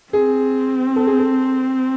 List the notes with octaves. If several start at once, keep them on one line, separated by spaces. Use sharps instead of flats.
C4 G#4
A4
G#4
A4